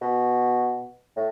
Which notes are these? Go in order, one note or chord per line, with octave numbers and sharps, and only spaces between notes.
B2
A2